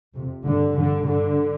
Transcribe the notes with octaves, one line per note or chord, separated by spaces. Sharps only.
F2 C3
G2 D3
G2 D3
G2 D3